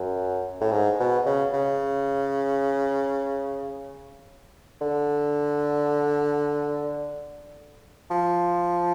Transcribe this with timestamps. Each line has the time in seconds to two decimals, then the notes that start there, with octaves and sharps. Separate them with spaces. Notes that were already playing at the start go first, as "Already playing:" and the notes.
Already playing: F#2
0.61 A2
0.71 G#2
0.99 B2
1.26 C#3
1.53 C#3
4.81 D3
8.10 F3